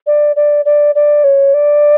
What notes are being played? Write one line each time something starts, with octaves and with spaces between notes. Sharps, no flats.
D5
D5
D5
D5
C#5
D5